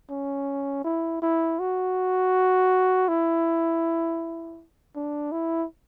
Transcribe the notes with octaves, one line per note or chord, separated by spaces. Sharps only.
C#4
E4
E4
F#4
E4
D4
E4